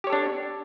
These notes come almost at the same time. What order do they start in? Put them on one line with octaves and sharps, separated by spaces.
G4 C#5 A4 D4